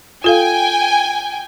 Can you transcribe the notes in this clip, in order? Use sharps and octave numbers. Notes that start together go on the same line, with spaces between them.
F4 A4 F5 G5 G#5